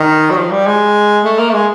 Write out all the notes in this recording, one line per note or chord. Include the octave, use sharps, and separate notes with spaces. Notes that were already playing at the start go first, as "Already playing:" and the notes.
Already playing: D#3
F#3
F3
G3
G#3
A3
A#3
A3
G#3